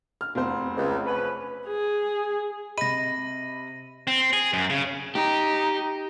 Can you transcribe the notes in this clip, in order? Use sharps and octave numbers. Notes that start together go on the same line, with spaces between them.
F6
F1 E2 C5
C#2
F3 C#4 B4
G#4
C3 D#5 B5 A#6 D#7
C4
G#4
F#2
C#3
D#4 G4